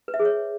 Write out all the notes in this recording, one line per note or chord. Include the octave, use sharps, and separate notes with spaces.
B4
E5
G#4
C#5